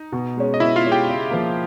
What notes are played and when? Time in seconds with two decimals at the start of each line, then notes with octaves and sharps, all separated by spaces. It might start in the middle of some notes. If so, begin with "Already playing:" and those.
Already playing: D#4
0.12 B2
0.37 G#3 C#4
0.54 D#5
0.60 B2 E4 E5
0.76 F4 F5
0.84 G#3 C#4
0.92 G4 G5
1.08 C#3
1.31 F3 A#3